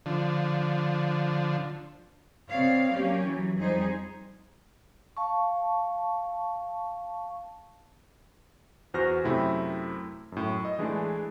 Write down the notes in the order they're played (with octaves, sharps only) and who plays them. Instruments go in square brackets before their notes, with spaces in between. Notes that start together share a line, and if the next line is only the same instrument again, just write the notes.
[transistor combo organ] D3 F3
[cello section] C3 B3 C4 C#5 D5 F5
F#3 A#3 C#4 G4
E3 F#3
F2 G3 D#4 G#4 C5
[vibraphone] F5 A5 C#6
[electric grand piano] E2 F#4 C5 F6 A#6
F#2 C3 A3 C4 E4
F#2 A2
D#5
E3 G#3 A3 D4 G#4